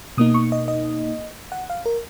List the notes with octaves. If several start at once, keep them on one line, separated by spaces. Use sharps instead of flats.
B2 A#3 D#4 D#6
C#6
D#5
D#5
F#5
F5
A#4